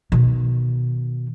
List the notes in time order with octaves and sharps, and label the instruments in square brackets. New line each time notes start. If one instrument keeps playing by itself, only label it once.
[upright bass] B2 D#3